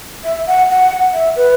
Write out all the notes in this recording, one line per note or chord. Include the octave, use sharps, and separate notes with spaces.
E5
F#5
F#5
E5
B4